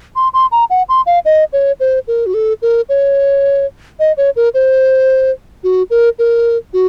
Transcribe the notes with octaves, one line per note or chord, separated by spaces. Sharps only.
C6
C6
A#5
F#5
C6
F5
D#5
C#5
C5
A#4
F#4
A4
A#4
C#5
D#5
C#5
A#4
C5
F#4
A#4
A#4
F#4